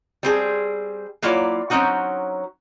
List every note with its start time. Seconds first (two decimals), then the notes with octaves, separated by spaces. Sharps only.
0.23 G3 C4 G#4
1.22 F#3 A#3 E4 F4 C#5 D5
1.70 F#3 C4 C#4 D#4 F#4